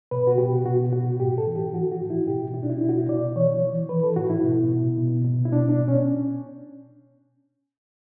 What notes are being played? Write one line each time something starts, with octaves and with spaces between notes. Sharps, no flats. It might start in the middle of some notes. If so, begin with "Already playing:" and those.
B2 B4
F#4
B2 G4
B2 F#4
B2 F#4
A2 G4
A4
E3
G4
E3 F#4
F#4
A2
E4
B2 G4
B2 E4
D4
E4
B2 E4
F#4
E4
B2 D5
E3 C#5
E3
E3 B4
A4
A2 F#4
E4
B2
B2
B2
B2
E4
B2 D4
D4
B2
C#4